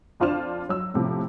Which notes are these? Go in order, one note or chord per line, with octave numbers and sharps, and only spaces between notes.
F2 D4 F4 C5 F6 E7
F#3 E6
A2 C3 F3